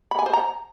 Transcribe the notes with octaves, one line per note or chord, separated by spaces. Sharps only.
B5
G#5
C5
A#5